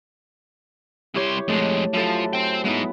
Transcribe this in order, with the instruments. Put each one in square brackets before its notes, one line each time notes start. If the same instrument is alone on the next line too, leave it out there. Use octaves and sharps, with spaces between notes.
[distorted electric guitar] C2 C6 [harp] E4 G4 C#5
[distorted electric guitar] F2 G#3 [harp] A3 A4
[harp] F#2 E4 A4 [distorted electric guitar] F3
[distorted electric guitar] C5 G5
[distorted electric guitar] G#3 D#4 [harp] B3 E4